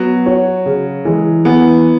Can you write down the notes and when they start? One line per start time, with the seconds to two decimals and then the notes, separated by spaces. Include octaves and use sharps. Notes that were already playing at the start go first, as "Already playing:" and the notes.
Already playing: F#3 B3
0.26 F#4 C#5
0.66 C#3
1.05 E3 G#3
1.45 E3 B3